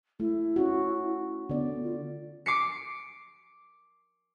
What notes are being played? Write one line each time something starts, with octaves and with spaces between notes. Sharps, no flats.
A3 E4
C#4 F#4
D3 B3 D5
F4
D6 C7 C#7